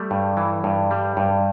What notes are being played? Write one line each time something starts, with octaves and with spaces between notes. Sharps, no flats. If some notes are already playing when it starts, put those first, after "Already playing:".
Already playing: G3 A3
G2
E3
G2
G3
G2